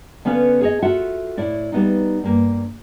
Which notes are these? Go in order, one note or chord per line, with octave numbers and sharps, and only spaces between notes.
D3 B3 C#4 B4 F5
G#4 C#5 D#5
F4 F#4 A4 E5 F#5
A2 E4 D5
G3 B3 D#4
G2 A#3